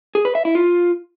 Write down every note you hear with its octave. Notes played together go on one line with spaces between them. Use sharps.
G#4
B4
E5
E4
F4